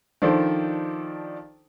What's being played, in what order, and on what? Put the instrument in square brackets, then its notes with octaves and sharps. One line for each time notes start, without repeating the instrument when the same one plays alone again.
[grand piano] D#3 F3 D4 A4 C5